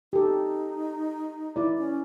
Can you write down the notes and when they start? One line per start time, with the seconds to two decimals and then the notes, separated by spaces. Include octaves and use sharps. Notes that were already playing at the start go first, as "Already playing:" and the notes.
0.13 D#4 G4 A4
1.56 E4 D5
1.78 C#4